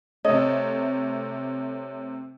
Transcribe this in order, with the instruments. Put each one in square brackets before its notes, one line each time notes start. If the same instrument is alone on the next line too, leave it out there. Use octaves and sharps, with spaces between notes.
[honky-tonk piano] C3 A3 [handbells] C#5 [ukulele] D#5